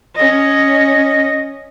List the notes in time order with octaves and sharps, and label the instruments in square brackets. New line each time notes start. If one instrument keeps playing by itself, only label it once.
[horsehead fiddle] C#4 D#5